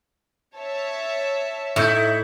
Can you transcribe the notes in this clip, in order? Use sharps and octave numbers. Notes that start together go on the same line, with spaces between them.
C#5 E5 A5
A2 A3 D#4 E4 E5 G6